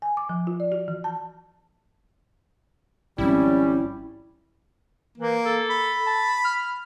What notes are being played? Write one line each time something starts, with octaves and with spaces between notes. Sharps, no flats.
G#5
D6
F3
F4
D5
F#4
E3
A5
G#1 F3 G3 C4 C#4 E4
E3 A#3
A4
B5
A5
F6